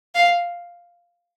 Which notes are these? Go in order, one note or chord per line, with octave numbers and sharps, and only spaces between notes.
F5